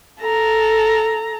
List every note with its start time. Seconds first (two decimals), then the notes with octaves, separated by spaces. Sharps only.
0.21 A4 A#5